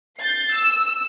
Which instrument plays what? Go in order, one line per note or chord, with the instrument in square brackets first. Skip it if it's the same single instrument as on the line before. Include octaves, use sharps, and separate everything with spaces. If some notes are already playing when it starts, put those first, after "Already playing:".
[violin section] G6 A6 C7
E6